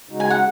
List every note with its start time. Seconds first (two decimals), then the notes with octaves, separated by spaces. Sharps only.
0.09 C#3 G#3 D#4 F#4
0.20 G#5
0.30 F#5